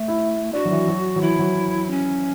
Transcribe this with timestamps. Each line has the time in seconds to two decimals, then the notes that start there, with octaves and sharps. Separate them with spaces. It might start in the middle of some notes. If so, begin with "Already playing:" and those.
Already playing: A3
0.08 E4
0.53 D4 F#4
0.65 F#3
0.71 E3
0.88 F#3
1.16 F#3
1.22 E3 E4
1.39 F#3
1.90 C#4